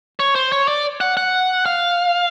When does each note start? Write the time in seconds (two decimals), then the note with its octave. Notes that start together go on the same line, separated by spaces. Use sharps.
0.20 C#5
0.35 C5
0.52 C#5
0.68 D5
1.01 F#5
1.17 F#5
1.66 F5